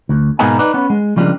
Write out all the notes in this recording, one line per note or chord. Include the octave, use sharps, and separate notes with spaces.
D2
G#2 B2 A#3 B3 D#4 G#4
D#4 B4 D5
B3 C#4 F#5
G#3
C#3 F3 G3 G#3 A#3 D4